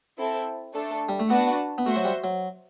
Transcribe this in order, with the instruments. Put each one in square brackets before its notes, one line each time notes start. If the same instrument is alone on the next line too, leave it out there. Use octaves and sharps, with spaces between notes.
[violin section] C4 E4 A4
A3 D4 A4
[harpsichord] G3
A3
[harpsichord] B3 [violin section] D4 F#4 B4 F#5 A5
[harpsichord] B3
[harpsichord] A3 [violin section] F#4 C5 E5
[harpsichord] F#3
G3
F#3